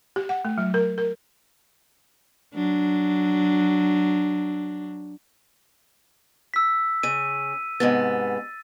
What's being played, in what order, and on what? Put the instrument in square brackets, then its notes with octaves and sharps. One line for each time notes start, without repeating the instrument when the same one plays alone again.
[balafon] G4
F#5
A3
F#3
A#4
A#4
[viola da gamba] F#3 D4
[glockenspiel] E6 B6
[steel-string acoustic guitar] C#3 [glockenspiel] D#7
[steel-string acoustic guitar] G#2 C3 B3 [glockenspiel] A6